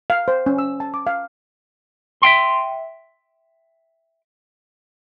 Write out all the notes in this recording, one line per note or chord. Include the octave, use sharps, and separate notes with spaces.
F5
C5
C#4
E6
A5
D6
F5
E5 F5 G5 C6